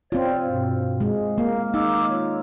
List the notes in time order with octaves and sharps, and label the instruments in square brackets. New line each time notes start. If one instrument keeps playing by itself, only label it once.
[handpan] C4 F4 [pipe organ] C#5 D5
[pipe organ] G2 B2
[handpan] G#3
[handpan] A#3 [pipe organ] F5
[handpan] D#4 [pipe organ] D6 E6
[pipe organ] F4 C#5